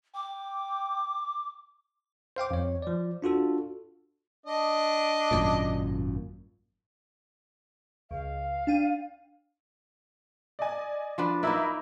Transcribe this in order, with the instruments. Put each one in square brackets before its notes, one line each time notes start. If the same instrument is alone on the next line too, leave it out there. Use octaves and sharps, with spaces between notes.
[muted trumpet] G5 [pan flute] D6
[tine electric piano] C5 F5 G5 D6
F2 C#5
F3 D5
D4 F4 F#4 A4
[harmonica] D4 D#5
[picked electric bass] G#1 F#2 A#2
[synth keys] C#2 [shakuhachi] F5
[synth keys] D4 G5 D#7
[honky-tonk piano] D5 D#5 G#5
[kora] F3 D4 B4
[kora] A#3 D#4 E4 [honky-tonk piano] A#4 E5 B5